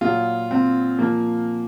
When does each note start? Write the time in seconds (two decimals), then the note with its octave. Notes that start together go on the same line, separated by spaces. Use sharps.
0.01 A#2 F#3 F4
0.51 C4
0.99 A#2 F3 A#3